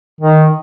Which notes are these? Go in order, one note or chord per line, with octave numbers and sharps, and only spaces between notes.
D#3